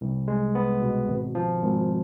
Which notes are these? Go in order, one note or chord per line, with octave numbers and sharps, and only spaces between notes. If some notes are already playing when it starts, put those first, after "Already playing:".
C2
G#3
B3
B2
G#1
F3
G#1